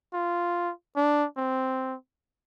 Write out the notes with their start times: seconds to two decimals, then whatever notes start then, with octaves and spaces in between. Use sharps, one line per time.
0.13 F4
0.96 D4
1.37 C4